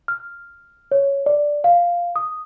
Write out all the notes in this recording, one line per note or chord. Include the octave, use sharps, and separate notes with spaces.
F6
C#5
D5
F5
D#6